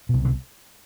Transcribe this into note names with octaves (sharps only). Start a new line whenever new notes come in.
C2 B2
D3